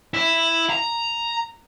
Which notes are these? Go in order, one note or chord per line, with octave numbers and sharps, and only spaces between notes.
E4
A#5